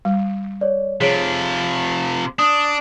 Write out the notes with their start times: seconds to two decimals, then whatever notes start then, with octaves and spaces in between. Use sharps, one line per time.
0.05 G3
0.61 C#5 D5
1.01 C3 F3 G#4 C#5 B6 D7
2.39 D4 D#6